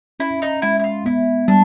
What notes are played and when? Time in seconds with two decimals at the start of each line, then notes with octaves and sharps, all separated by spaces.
0.20 C#4 E4
0.42 D#4
0.62 G#3 E4
0.80 E4
0.84 F4
1.06 B3 E4
1.48 G3 D4